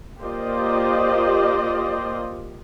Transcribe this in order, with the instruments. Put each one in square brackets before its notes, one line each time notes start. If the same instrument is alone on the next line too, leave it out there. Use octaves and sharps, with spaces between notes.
[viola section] A#3 F4 G4 C5 D5 D#5